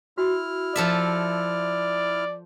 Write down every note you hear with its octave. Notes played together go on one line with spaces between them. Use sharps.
E4 F#4 F6
F3 A4 D5 E5